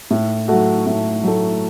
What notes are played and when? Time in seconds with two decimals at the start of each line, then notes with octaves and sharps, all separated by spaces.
0.10 A2
0.48 F#3 A3 F#4
0.86 A2
1.24 F#3 A3